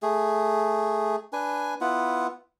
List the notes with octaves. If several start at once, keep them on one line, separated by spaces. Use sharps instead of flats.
A3 G#4
D4 B4 G#5
B3 E4 F4 F#5